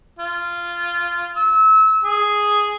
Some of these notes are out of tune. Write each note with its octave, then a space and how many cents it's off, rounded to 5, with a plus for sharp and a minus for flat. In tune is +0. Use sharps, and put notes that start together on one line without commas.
F4 -15
E6 -30
G#4 +0